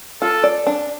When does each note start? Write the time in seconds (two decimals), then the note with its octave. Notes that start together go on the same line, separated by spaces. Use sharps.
0.22 F4 A4
0.44 D5
0.67 D4